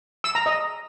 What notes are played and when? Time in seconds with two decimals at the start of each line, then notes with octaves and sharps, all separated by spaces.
0.24 E6
0.35 A#5
0.46 D#5